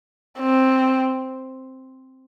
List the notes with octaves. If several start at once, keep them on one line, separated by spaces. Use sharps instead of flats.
C4